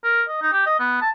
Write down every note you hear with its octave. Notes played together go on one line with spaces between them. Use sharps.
A#4
D#5
D#4
G4
D#5
B3
A5